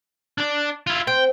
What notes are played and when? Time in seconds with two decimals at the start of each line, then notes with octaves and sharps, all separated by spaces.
0.38 D4 D5
0.87 E4 F4
1.07 C4 G5